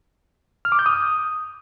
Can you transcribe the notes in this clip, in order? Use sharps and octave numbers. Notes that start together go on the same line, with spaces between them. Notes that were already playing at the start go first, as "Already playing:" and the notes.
F6
D6
G6
D#6